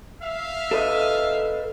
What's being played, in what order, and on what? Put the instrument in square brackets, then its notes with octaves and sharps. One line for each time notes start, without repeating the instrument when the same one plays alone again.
[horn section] E5 F5
[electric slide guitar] A4 B4 D#5